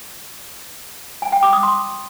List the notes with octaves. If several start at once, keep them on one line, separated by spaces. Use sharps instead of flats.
G#5
G5
D6
D#6
C6